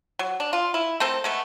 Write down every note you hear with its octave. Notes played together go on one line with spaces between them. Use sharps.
F#3
D4
F4
E4
A3 A#3 C4 A4
G#3 A3 B3